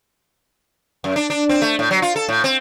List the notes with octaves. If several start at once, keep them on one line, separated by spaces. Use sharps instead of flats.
F#2
D4
D4
C4
A3
A2
F#3
F4
A4
A2
C4